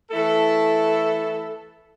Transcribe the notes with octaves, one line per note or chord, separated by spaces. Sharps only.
E3 A3 E4 A4